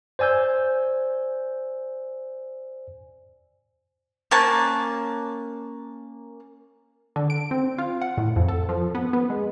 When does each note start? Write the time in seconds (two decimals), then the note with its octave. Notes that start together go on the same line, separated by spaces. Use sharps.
0.19 C5 D5 G#5 E6 G6
4.31 A#3 C#4 A5 F#6
7.16 D3
7.30 D7
7.51 C4
7.78 F4
8.01 F#5
8.18 A2
8.36 F2
8.48 A4
8.69 F3
8.95 B3
9.13 B3
9.30 G#3